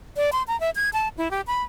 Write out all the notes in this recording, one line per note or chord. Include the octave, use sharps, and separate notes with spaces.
D5
C6
A#5
E5
G#6
A5
E4
G4
B5